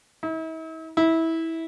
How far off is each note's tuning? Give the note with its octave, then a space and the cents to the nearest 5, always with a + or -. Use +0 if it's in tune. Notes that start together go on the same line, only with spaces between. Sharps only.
E4 -45
E4 -20